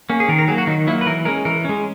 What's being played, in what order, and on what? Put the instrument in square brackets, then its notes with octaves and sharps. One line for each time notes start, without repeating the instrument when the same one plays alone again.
[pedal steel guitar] A#3 C#4
G#4
D#3 A#4
A#4
F#3 G#4
A#3
F#4
D#3 D#4
F#3 A#3 E4
B4
E3 A#4
G#3 C#4 A#4
E3 A#4
G#3 C#4